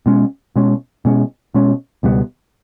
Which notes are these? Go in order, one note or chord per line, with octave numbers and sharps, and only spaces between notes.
B2 G#3 C#4
B2 G#3 C#4
B2 G#3 C#4
B2 G#3 C#4
C#2 B2 G3 B3